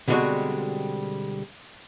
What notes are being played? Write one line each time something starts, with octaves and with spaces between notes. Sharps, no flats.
B2 D3 G3 G#3 C4 F#4